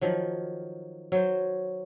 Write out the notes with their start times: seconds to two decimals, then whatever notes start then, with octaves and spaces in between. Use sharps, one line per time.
0.01 D#3 F3 F#3
1.12 F#3 C5